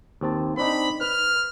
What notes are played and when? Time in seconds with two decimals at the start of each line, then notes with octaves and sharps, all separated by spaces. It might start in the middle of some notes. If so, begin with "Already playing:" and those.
0.21 D#2 C4 A5
0.57 C4 D4 D#4 B5
1.01 B4 F6